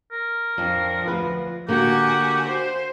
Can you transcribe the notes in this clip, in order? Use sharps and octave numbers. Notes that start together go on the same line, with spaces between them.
A#4
F2 F3 D4
D2 F4 B4
D3 A#3 F#4 G4 F#5 G#5
C5